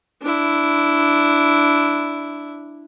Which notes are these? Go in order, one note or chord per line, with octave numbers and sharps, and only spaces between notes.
D4 E4